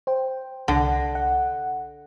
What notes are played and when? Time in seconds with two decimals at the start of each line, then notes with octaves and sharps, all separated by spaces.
0.07 C5 G5
0.68 C2 D3 F#5 A#6
1.15 F#5